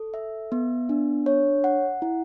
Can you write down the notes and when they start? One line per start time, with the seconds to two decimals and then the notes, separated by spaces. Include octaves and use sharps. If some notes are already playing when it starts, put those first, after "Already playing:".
Already playing: A4
0.14 E5
0.52 B3
0.89 D4
1.26 C#5
1.64 F#5
2.02 E4